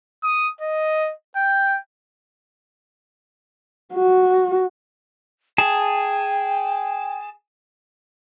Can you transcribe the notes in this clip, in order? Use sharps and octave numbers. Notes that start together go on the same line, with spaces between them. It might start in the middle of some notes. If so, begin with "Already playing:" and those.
D#6
D#5
G5
F#4
G#4 G5 A5